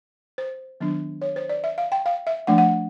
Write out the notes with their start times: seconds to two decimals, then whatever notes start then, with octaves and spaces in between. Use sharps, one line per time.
0.38 C5
0.80 D#3 F#3 B3 D4
1.22 C#5
1.36 C5
1.49 D5
1.64 E5
1.78 F5
1.92 G5
2.06 F5
2.27 E5
2.47 F3 A3 D4 F#5
2.58 F#5